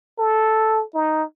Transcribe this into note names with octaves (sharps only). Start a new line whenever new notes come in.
A4
D#4